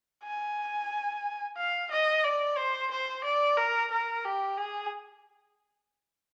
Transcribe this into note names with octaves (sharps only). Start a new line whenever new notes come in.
G#5
F5
D#5
D5
C5
C5
D5
A#4
A#4
G4
G#4